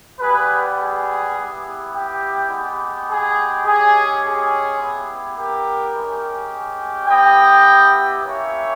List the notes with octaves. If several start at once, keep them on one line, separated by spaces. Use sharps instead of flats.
G3 B3 G4 G#4 B4
G#4
G3 B3 E4 G4
G4
G#3 B3 G4
G#4
G#3 C#4 G4 G#4
G#4
B3 E4 G4
G4 A#4
G#3 C#4 G4
B3 E4 G4 D#5 G5
A#3 C#4 E4 G4 C#5 E5